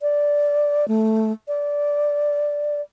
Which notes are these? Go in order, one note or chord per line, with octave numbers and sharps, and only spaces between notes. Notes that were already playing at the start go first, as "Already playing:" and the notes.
D5
A3
D5